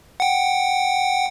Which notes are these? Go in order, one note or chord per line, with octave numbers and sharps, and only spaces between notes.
F#5 G5